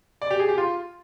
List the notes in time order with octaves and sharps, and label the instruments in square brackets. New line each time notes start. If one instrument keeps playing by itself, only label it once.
[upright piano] D5
G4
G#4
G4
F4